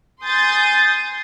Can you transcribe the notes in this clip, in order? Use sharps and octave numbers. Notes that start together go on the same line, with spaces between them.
G#5 C6 D#6 G6 A6